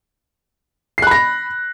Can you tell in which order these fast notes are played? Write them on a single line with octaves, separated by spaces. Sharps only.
C7 F#6 B5 A#6